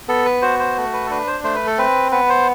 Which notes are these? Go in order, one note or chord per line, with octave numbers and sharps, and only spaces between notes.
B3 A4
B4
F#4 C5
C5
A3
B4
A4
D4 B4
C5
A3 C5
B4
A4
C4 B4
B3 B4
C5